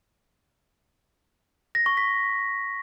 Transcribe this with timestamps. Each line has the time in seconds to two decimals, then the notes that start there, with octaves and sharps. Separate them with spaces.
1.75 A#6
1.86 C#6
1.97 B6